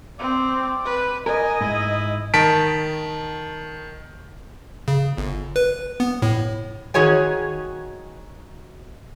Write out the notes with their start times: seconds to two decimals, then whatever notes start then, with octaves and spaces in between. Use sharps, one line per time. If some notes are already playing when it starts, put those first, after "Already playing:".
0.19 C4 D5
0.85 B4
1.26 A#4 D#5 G#5
1.61 G#2 E4
2.34 D#3 A5 B6 D7
4.88 C#3
5.17 G1
5.56 B4
6.00 B3
6.22 A2
6.94 D#3 F#4 G#4 C#5 G#5